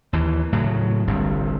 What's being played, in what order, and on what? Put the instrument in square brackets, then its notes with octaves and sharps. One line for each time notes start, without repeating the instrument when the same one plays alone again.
[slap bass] D#2 E3
A2 C#3 F#3
G1 C2 G2